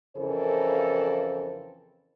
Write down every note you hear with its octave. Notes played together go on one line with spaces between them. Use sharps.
F2 C#3 E3 A4 A#4 C5